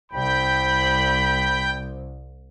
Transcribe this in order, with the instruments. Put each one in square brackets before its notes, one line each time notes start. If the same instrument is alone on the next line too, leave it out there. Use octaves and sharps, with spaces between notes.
[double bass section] C2 [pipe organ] G5 [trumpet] B5